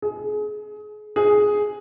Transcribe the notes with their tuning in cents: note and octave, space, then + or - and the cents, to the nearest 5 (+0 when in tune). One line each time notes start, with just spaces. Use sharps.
G#4 +30
G#4 +5